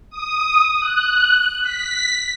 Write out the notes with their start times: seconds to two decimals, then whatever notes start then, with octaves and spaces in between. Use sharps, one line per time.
0.10 D#6
0.79 F#6
1.62 B6